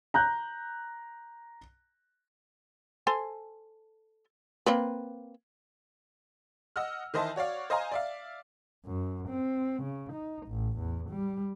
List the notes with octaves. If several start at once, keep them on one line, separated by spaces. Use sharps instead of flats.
A#5 F#6 G6
A4 C5 G#5
A#3 C4 B4
D#5 F#5 E6 F6
D#3 E3 C5 D#5 E5 A5
F#4 C#5 D5 F5
C5 D#5 F5 G#5 A#5
D5 E5 F5
F#2
C4
C#3
D#4
A1
E2
G3